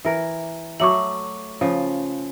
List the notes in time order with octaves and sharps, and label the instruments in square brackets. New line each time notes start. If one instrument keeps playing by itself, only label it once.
[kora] E3 A#4
[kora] F#3 A3 [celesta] C#6 D6 F#7
[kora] C#3 F3